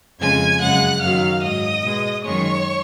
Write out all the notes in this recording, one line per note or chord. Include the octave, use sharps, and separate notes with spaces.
F2 C#3 G#3 G#5 G#6
F#2 C#3 G#3 F#5 F#6
F#2 D#3 F#3 F5 F6
G#2 F#3 D#5 D#6
B2 G#3
F#2 D#3 G#3 C#5 C#6